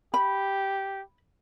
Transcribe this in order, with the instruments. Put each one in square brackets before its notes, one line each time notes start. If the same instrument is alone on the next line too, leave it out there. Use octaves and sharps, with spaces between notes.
[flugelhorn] G4 [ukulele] B5